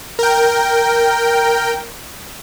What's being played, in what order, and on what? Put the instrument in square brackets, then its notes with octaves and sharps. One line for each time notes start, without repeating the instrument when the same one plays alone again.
[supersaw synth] A#4 G5